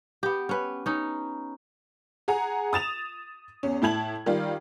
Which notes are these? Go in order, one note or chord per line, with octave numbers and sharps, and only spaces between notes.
B3 G4
C#4 B4
C#4 D#4
G#4 F#5 G#5 A#5
D#6 A6 E7 F7
E2 C#4
A2 E4 A5 G#6 F#7
D#3 G3 F4